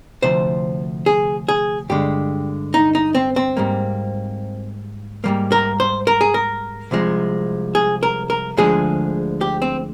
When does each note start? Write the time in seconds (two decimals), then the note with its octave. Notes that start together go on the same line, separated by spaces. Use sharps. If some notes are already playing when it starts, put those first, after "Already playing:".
0.22 D2 C3 F3 C5
1.06 G#4
1.49 G#4
1.89 G2 D3 G#3 G4
2.74 D#4
2.95 D#4
3.15 C4
3.36 C4
3.57 G#2 G3 A#3
5.24 G#2 G3 A#3
5.52 A#4
5.80 C5
6.07 A#4
6.21 G#4
6.34 A#4
6.91 C2 C3 F3 G#3
7.75 G#4
8.03 A#4
8.30 A#4
8.57 D2 D3 F3 G#3 G#4
9.41 G4
9.62 C4